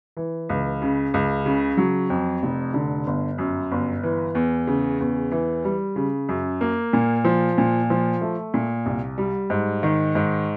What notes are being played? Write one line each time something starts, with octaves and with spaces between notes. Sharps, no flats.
E3
C#2
C#3
C#2
C#3
F#3
F2
F1
D3
G1
F#2
G1
E3
E2
C#3
E2
E3
G3
C#3
F#2
A#3
A#2
F3
A#2
F3
A3
A#2
C2
G3
G#2
D#3
G#2